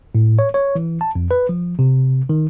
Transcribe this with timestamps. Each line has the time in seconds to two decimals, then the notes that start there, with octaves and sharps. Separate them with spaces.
0.15 A2
0.39 C#5
0.54 C#5
0.75 E3
1.01 A5
1.15 F2
1.31 B4
1.49 F3
1.79 C3
2.29 D#3